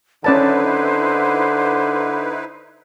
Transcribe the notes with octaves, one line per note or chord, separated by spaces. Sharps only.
D3 C#4 D#4 E4 B4 C5 D5 A5